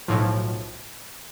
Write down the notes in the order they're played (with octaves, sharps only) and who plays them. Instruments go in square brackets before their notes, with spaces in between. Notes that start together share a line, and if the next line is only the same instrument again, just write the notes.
[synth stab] B1 A2 F3